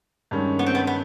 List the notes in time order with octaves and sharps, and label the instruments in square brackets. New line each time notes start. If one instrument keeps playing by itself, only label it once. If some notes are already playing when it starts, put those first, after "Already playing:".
[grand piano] G2 D#3 G#3 C#4
[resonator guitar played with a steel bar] B3
C4
B3
B3